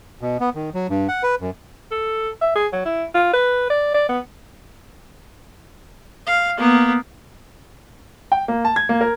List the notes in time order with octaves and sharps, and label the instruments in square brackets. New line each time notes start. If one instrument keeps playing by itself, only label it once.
[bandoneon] B2
B3
D#3
F#3
G2
F#5
B4
F#2
[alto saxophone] A4
E5
G#4
F#3
E4
F4
B4
D5
D5
B3
[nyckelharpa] F5
A#3 B3
[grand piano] G5
A#3
A5
G#6
A#3
A#4